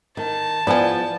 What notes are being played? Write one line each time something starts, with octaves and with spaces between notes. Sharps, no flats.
D#3 A5
F3 B3 E4 G#4 D5